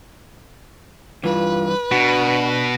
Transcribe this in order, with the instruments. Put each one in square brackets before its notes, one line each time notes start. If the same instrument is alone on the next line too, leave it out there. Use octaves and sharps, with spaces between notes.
[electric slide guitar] G2 E3 [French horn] F4 [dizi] B4
[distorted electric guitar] B2 [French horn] D4 [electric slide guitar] F#4